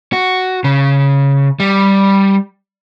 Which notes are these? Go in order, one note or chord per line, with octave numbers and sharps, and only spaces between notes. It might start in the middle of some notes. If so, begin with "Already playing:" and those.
F#4
C#3
G3